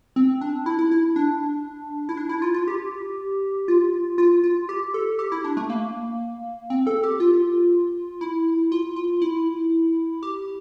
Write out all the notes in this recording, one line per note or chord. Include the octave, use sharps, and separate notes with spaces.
C4
D4
E4
E4
E4
D4
E4
D4
E4
F4
F4
G4
F4
F4
F4
G4
A4
G4
E4
D4
A3
A#3
C4
A4
G4
F4
E4
F4
F4
E4
G4